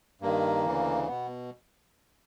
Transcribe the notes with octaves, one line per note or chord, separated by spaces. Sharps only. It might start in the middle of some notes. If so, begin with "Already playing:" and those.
G2 D#3 A#3
D2 C#3 E3
B2 B3